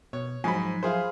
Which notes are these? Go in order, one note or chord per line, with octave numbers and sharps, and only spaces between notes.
B2 C#5
G#2 F3 F#3 G#5 B5
F4 G#4 C5